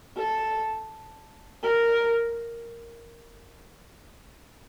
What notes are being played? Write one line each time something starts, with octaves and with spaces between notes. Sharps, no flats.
A4
A#4